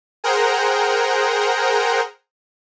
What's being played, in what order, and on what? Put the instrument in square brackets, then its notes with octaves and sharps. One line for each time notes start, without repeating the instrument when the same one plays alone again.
[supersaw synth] G#4 A#4 C5 F#5 G5 A#5